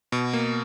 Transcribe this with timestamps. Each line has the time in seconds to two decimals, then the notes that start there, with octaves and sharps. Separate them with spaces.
0.12 B2
0.33 A#3